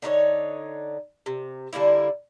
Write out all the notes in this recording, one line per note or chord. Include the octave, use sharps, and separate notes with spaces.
D3 D#4 E4 C#5
C3
D3 G3 A#3 E4